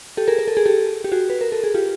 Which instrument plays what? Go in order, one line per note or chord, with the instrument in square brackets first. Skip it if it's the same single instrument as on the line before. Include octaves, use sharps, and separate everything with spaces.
[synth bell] G4 A4
G#4 A#4
A#4
A4
G#4
G4 A4
G4
F#4 G#4
B4
A#4
A4
G#4
F4 G4